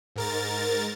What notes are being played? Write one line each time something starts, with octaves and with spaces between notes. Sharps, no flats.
G#2 A#4 A6